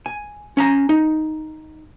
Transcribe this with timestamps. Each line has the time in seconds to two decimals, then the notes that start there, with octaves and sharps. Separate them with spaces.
0.06 G#5
0.57 C#4 G#5 A#5
0.89 D#4